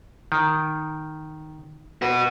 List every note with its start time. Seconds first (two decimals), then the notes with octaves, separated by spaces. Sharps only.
0.32 D#3
2.02 F#4 B4